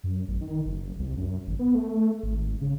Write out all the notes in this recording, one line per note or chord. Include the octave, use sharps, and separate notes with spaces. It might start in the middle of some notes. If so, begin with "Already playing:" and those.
F#2
A1
D#3
F#1
C2
F#2
G#1
B3
A3
G#1
C#3